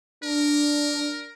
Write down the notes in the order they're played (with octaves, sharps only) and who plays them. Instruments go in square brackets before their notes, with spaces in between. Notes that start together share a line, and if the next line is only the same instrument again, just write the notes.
[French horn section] D4 [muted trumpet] A#4